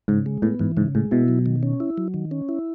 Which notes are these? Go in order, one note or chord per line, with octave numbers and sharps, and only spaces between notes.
G#2 C#3
G#3
A2 B3
G#2 E3
G#2 C#3
A2 G#3
B2 E4
F#3
D#3
C#4
E4
F#3
D#3
C#4
E4